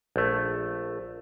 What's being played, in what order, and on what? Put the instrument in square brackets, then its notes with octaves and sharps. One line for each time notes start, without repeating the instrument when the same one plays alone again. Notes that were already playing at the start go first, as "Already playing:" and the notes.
[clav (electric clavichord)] A#1 A3